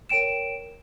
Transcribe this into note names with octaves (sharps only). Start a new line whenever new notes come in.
A#4 C#5 G5 D7 E7